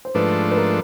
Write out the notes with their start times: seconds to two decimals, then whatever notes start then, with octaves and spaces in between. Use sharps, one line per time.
0.05 C5
0.14 G#2 F3 A3 D4 B4
0.51 B4
0.56 A#4